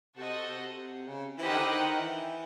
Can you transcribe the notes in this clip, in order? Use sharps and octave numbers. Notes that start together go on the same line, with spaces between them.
C3 F#4 A4 C5 D#5 F#5
C3
C#3
E3 E4 G4 C5 D#5 F#5
D#3
D3
D#3
E3